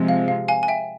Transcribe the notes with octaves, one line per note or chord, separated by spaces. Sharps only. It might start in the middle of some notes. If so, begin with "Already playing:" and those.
Already playing: C3 F3 G#3
F5
F5
F5 G#5
G#5
E5 G5